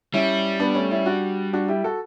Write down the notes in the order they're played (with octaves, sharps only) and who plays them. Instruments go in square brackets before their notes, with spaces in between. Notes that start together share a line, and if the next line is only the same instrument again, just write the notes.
[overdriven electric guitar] G3 [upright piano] C#4 E4
[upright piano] B3 D4
A3 C#4
C#4 E4
D4 F#4
D4 F#4
E4 G4
F#4 A4